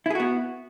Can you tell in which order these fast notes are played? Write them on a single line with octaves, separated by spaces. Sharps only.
E4 G#4 F#4 B3